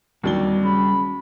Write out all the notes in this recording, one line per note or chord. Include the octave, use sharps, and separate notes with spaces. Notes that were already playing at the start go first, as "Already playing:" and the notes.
D1 D#2 F#3 G3 D5 G7
C#3 B5